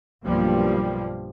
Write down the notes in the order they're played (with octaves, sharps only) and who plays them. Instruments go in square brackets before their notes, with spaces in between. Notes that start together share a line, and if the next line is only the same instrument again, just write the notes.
[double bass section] B1 G2 F3 G3 A#3